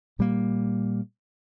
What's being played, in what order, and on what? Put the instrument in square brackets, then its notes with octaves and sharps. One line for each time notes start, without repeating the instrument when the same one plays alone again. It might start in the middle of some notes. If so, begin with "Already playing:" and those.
[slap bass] A#2 G3 A#3